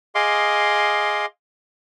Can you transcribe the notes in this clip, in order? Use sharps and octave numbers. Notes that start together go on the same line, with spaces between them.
G#4 D#5 F5 C6 D6